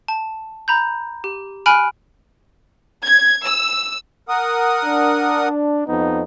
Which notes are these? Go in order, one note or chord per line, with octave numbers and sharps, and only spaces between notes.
A5
A#5 B5 G6
G4
G#5 B5 F6 F#6 D7
G#6
E6
A#4 F#5 D#6
D4
F2 B3 D#4